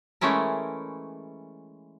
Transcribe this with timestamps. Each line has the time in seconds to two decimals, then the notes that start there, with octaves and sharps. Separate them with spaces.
0.21 E3 G#3 A3 C#4 E4 A#4